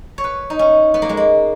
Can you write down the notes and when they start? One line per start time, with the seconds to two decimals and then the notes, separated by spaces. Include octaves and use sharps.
0.18 C#5
0.24 B4
0.50 D#4
0.59 C#4
0.94 B3
1.02 A#3
1.09 G#3
1.17 A#3